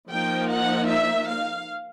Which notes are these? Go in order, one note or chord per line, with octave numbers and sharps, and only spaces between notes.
F3 A#3 D#4 G5
F#5
E5
F5